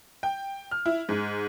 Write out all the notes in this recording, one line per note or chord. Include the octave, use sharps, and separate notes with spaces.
G5
F6
E4
G#2